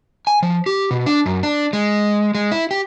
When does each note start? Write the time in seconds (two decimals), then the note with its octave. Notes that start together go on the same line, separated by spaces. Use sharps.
0.27 G#5
0.43 F3
0.66 G4
0.91 B2
1.06 D4
1.26 F#2
1.43 D4
1.73 G#3
2.35 G#3
2.51 E4
2.71 G4